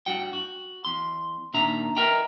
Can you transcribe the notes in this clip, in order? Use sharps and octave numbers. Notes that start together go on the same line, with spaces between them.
G2 F#4 F#5 G5
F#4
E2 C6
A#2 D#3 D4 E5 A#5
A#4 B4 D#5 E5 G5 A#5